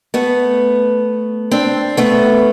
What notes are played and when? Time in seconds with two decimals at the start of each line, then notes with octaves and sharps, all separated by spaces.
0.14 A3 B3
1.51 C4 D4
1.97 A3 B3